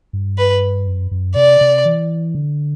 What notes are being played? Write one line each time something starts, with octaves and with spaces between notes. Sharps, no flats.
G2
B4
F#2
F#2
C3 D5
C3
E3
D3